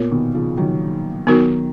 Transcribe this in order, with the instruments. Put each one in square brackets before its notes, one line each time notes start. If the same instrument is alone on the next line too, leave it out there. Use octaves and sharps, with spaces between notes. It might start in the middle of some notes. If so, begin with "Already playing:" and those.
Already playing: [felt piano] A#2 [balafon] B3 F4 A#4 C#5
[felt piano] B2 D#3
C#3 F3
D#3 F#3
[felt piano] D#3 F#3 [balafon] B3 D#4 F#4 A#4